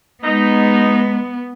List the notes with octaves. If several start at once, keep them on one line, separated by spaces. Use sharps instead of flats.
G#3 B3 D#4